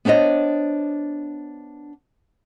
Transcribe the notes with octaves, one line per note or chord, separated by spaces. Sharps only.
B3 D4 C5 C#5 D#5